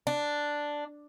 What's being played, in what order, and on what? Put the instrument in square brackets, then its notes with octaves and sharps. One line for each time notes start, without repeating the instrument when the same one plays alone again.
[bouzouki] D4